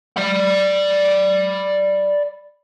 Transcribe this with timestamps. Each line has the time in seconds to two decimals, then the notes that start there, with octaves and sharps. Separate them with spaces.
0.17 D5 B5